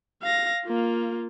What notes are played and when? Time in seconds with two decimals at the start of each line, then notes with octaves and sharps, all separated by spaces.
0.23 F5 A#6
0.66 A#3 F4